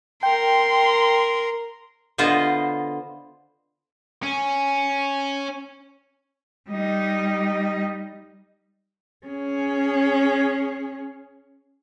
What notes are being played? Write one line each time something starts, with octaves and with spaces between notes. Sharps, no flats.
A#4 G5 C6
D3 B3 F4 C5 D#5
C#4
G3 D#4
C#4 G#4